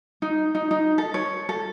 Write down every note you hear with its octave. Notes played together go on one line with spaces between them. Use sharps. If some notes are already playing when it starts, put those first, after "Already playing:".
D#4
D#4
D#4
A4
C#5
A4